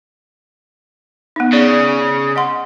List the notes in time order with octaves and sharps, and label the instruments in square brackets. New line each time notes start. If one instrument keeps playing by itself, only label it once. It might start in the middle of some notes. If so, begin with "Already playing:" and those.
[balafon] B3 D#4
[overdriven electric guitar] C#3 [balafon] D5
[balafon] D#5 F#5 C6